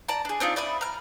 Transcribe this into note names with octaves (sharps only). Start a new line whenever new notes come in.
D5 A5 A#5
D4 G#4
C4 D4 D#4 F4
D5 E5 B5 D#6
A#5 F6